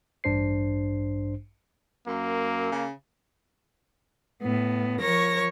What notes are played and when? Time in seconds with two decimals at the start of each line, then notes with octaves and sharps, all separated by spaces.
0.24 A1 G2 D4 C5 C7
2.07 F#2 A#3
2.72 C#3
4.43 A2 B3
5.02 F3 A#4 C#5 C#6 A#6